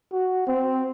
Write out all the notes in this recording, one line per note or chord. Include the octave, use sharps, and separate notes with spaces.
F#4
C4